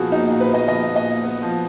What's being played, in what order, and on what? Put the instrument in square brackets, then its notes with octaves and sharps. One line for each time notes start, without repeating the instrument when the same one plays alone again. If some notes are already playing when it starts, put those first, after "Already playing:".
Already playing: [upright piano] A#2 F3 B3 F#4 G#4
A#2 D#4
A#2
B4
B3 D#5
F3 D#5
A#2
D#5
A#2
B3
F3